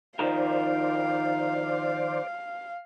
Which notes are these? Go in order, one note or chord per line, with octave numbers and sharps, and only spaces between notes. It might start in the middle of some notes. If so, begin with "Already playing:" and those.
D#3 F3 A#4 C5 D5 F5